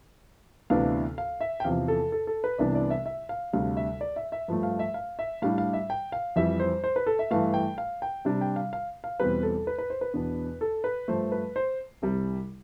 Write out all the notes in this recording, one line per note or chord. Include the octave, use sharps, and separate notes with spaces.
D2 C3 E3 B3 D4 F5
F5
E5
G5
E2 C3 F3 F5
A4
A4
A4
B4
C2 C3 E3 B3 D4 D5
D5
E5
E5
F5
D2 C3 G3 D4 F5
E5
D5
E5
E5
G2 F3 A3
F5
E5
F5
E5
A2 G3 D4 F5
F5
E5
G5
F5
F2 E3 G3 E5
C5
C5
B4
A4
E5
G2 E3 A3 F5
G5
F5
G5
C3 G3 D4
G5
F5
F5
F5
E2 B2 G3 C4 B4
A4
B4
B4
C5
B4
E2 B2 B3 D4
A4
B4
G2 F3 A3 C5
B4
C5
C2 C3 G3